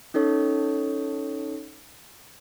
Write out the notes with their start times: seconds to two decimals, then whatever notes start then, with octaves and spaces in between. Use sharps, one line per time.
0.14 C#4 D#4 A4 C#5